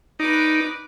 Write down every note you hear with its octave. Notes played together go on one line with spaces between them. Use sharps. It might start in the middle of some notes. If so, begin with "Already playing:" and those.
D#4 B4 D5